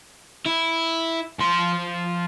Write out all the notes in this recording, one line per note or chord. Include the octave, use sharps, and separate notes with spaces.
E4
F3 C6